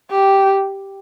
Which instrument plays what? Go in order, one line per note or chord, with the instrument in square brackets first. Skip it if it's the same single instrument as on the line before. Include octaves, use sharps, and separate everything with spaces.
[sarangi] G4